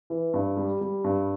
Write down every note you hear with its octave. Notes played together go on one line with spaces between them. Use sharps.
E3
G2
G3
G3
G2